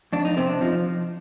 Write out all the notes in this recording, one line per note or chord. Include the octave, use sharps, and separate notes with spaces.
F2 D4
D#4
C3 C4
D4
F3 D#4